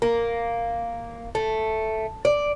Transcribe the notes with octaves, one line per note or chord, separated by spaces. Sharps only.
A#3
A3
D5